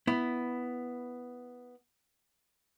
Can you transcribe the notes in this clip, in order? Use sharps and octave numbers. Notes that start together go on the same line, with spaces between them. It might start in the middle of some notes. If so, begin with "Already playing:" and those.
B3 E4